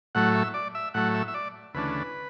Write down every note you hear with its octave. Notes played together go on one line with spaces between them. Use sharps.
A2 F#3 A3 F#5
E5
D5
E5
A2 F#3 A3 F#5
E5
E5
D5
D2 C#3 E3 A3 D4 B4